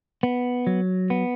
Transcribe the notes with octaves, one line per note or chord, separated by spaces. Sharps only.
B3
F#3
B3